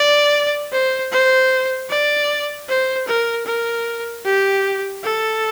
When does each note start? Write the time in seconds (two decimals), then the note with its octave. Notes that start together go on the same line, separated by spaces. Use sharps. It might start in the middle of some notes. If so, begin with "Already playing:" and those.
Already playing: D5
0.73 C5
1.12 C5
1.90 D5
2.69 C5
3.07 A#4
3.46 A#4
4.25 G4
5.03 A4